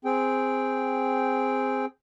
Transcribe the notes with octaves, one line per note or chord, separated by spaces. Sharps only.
C4 G#4 G5